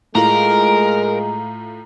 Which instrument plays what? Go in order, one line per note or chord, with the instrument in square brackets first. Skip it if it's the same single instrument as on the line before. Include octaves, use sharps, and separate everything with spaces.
[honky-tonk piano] A2 F4 [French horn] G#3 [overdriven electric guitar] A#4 [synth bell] A#5